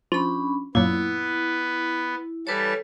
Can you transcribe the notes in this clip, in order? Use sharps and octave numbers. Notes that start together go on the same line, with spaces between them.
F3 C#4 D4 B5
F#2 A#2 B3 E4 B4
E3 G3 A4 B4 C#5 A5